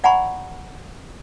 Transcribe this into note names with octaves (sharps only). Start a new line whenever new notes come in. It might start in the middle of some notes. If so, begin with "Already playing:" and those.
D5 F#5 G#5 A#5 B5 C#6